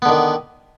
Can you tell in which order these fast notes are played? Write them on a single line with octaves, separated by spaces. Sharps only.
B3 D3 D#3